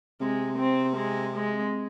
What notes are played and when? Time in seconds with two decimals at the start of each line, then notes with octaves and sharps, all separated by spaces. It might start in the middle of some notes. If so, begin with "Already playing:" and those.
0.20 C3 G#3
0.59 C4
0.97 G#3
1.36 G#3